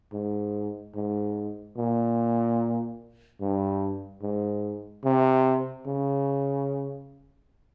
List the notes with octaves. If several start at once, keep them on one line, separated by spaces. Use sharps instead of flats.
G#2
G#2
A#2
G2
G#2
C3
C#3